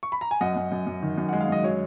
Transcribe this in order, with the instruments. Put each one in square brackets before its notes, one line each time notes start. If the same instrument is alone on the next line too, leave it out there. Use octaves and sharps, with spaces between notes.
[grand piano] C#6
B5
A#5
G#5
F#2 D#5 F#5
F#2
F#2
F#2
D#3
F#2
G#3 F#5
F5
F#2 D#5
F#3 C#5